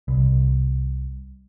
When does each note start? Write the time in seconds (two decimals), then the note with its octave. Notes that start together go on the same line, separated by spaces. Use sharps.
0.08 C2